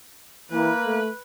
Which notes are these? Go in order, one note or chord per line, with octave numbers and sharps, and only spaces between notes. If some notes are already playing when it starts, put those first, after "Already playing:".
E3 A#3 B4
A3